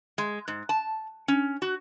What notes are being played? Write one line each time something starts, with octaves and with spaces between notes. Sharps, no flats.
G#3
G#2
A5
C#4
F#4